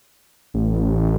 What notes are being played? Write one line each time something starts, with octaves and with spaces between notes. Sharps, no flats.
A1